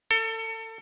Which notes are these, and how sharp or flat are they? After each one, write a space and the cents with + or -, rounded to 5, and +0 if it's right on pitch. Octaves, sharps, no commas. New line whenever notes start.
A4 +30